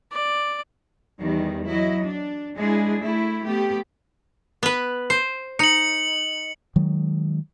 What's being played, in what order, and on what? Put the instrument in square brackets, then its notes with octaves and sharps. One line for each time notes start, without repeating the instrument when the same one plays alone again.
[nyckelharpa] D5
[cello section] E2 D#3 G3
F#3 E4 D#5
D4
G#3 D4 E4 G#4
A3 E4
A3 B3 G4
[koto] B3 B4
C5
[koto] D#4 [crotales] C#7 F#7
[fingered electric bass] D#3 F#3 G#3